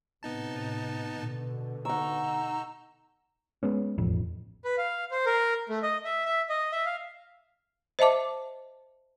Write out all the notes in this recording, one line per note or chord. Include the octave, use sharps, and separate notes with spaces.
A2 C3 B3 D#4 A5
B2 D3
D#4 F#5 A#5 C#6 E6
G#3 B3 C#4
E1 A1 F2
B4
F5
C5
A#4
A3
D#5
E5
E5
D#5
E5
F5
C5 D#5 E5 A5 D6